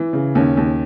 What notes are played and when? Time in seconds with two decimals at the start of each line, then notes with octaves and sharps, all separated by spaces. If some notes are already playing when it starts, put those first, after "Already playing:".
Already playing: E3
0.13 C#3
0.35 D#2 C#4
0.57 D#2